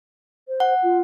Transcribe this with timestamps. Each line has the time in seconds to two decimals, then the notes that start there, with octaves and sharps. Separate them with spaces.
0.48 C5
0.60 F#5
0.83 F4